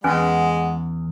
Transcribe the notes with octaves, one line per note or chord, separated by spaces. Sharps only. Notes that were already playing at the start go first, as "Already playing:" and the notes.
E2 G#3 C#4 B4 F#5 G#5